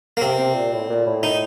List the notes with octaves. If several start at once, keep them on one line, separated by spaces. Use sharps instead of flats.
A#3
C3 C4
C3
A#2
A2
A#2
A2
D#4